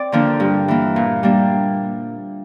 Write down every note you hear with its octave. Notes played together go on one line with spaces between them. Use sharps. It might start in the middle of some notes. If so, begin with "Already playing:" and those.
Already playing: C4 D5
D3 F3 A#3 D4
G2
E3 A#3
A#2
G3 A#3 D4